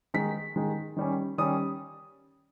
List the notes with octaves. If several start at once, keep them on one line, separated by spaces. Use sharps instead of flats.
D#3 G#3 D#4 B6
D#3 G#3 D#4
D#3 G3 C#4
D#3 G3 C#4 D#6